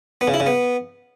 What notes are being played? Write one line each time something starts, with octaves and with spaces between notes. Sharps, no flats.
B3
C#3
E4
C#3
B3